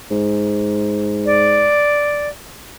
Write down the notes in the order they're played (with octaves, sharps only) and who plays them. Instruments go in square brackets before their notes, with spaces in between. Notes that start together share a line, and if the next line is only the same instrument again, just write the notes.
[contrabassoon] G#2
[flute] D5